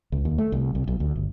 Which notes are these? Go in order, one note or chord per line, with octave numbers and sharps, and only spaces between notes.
C#2
D#2
A3
C2
C2
B1
D2
G1